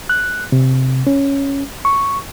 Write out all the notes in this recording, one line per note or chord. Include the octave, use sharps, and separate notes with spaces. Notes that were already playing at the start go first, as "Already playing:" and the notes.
F#6
C3
C#4
C#6